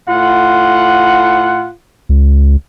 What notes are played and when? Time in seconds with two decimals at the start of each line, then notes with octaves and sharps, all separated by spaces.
0.08 A2 F4 F#5
2.09 C#2